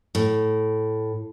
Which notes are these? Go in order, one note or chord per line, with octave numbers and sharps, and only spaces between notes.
A2